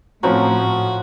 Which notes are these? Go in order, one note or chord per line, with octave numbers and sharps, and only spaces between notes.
A2 F3 C4 C#4 F#4 A#5